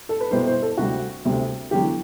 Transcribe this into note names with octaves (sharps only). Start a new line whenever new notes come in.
A4
B4
C2 B2 G3 C5
C5
A4
D2 C3 G3 F#4
D2 C3 G3
E2 D3 F#3 G4